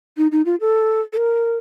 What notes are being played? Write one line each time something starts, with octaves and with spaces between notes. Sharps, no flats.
D#4
D#4
F4
A4
A4
A#4